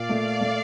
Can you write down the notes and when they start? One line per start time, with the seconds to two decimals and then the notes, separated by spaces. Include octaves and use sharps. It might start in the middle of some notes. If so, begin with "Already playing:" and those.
Already playing: A#2 D5 F5
0.09 A3
0.41 A3